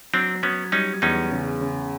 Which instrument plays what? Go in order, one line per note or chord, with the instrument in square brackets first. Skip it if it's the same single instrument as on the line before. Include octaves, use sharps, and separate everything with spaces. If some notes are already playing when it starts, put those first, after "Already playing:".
[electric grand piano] F#3 [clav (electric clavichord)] C4 D4
[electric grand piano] F#3 [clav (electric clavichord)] B3 C#4
[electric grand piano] G3 [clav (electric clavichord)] C#4 D#4
[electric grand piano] E2 [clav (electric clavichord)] C#4 D#4
[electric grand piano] C#3
C#3